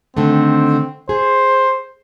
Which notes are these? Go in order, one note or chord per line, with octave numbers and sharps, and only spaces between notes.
D3 D#3 A3 C4
G#4 C5